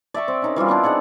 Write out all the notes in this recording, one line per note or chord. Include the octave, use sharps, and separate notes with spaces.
D5 E5 G5 C#6
C4
C#4 D#4 A#4
E3 G3 C4 F4
B3 C4 D4 E4
D#4 G#4 D5 F#5